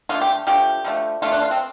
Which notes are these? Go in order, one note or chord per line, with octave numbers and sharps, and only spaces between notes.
D3 A3 F4
G4
D3 F3 A3 G4
D3 F3 A3
D3 A3 F4
D4
F4
C4